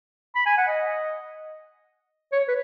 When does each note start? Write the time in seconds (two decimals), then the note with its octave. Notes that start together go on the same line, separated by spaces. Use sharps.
0.35 B5
0.46 G#5
0.57 F#5
0.68 D#5
2.32 C#5
2.48 B4